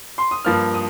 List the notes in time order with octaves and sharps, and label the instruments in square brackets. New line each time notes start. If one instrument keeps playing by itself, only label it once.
[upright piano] C6
D#6
[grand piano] G2 F3 A#3 [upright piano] F6
[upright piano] D#6